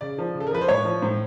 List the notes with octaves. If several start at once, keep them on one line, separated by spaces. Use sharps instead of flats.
C#3 D5
F3
C#3
A4
A#4
F3 B4
C5
A2 C#5
F3
A2 C5